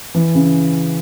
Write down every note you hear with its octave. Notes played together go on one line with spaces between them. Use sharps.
E3
C#3